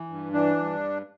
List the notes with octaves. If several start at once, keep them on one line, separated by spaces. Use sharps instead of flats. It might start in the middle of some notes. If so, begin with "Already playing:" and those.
Already playing: E3
G2
E3 D4
G2